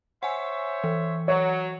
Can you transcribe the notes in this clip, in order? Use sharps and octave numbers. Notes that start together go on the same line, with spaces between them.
C5 C#5 E5 F#5 G#5
E3
F#3 C#5